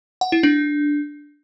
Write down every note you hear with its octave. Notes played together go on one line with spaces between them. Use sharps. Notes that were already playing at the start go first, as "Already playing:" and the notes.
F#5
E4
D4